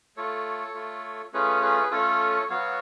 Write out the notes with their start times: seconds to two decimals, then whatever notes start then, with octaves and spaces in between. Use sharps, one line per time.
0.16 A3 F4 A4 C#5
0.74 A3 F4
1.33 A3 C#4 F4 G#4 B4
1.62 G#4 B4
1.91 A3 C#4 F4 A4 C#5
2.49 F#3 B3 F#4 C#5 F5